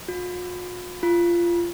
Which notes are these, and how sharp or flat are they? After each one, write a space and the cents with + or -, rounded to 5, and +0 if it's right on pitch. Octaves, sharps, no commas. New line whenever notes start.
F4 +45
F4 -20